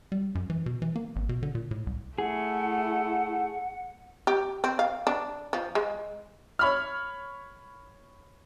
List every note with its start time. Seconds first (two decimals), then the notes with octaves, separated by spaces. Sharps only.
0.12 G3
0.35 F#2
0.50 E3
0.66 B2
0.82 E3
0.96 A#3
1.16 G#1
1.29 B2
1.43 D3
1.55 A#2
1.71 A2
1.87 C2
2.18 A3 E4 G#4 F#5
4.27 G4
4.64 C4
4.79 F5
5.07 D4
5.53 F3
5.75 G#3
6.59 C#5 B5 F6